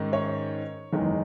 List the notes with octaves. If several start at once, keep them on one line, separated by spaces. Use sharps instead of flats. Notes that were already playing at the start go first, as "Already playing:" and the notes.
Already playing: G#2 D#3 G#3 C#4
C#5
F#1 E2 D#3 G#3 D#4